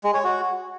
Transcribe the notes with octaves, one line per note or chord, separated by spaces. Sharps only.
G#3
C#5
F#4